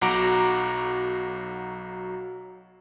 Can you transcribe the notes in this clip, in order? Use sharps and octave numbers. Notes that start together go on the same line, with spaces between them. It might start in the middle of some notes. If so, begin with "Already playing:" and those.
B1 F#3 F#4 A#5 D6 D7